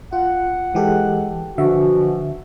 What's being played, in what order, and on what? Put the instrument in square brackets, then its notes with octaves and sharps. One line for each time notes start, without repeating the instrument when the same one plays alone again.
[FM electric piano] F4 [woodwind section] F#5
[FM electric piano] E3 G4 A4 [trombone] G#3
[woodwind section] B2 E3 F3 [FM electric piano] D3 E5 [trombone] F#4